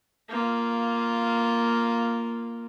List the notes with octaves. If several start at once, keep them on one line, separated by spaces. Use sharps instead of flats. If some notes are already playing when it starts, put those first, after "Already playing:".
A#3 F4